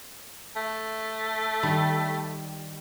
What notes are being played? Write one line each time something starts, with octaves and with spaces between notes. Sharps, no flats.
A3
D#3 G3